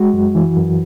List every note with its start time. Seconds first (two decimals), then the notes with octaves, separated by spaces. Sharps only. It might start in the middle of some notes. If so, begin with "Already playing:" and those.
Already playing: G#3 F#4
0.13 F#2
0.35 E3
0.56 F#2